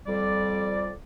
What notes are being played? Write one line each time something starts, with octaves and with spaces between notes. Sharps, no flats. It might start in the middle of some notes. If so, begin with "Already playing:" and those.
F2 G3 D5